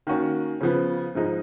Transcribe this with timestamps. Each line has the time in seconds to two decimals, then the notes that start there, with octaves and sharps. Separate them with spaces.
0.07 D#3 A#3 C#4 F#4
0.61 C#3 F3 B3
1.15 G#2 F3 G#3 D#4